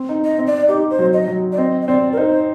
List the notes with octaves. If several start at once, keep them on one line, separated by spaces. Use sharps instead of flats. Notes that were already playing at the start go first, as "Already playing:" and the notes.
Already playing: C4
D#4
D#5
C4
D5
D#4 G4
C5
F#3
D#5
F#3
D5
C4 D#5
D#5
C4 D5
A#4
D#4 C5